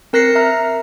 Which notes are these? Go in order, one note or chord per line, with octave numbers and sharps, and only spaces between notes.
C4 A#4 F#6 A#6 C7 C#7
E5 A#5 F6